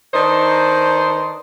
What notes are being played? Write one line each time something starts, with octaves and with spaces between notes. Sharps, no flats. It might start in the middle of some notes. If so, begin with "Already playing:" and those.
D#3 D4 D#4 B4 C5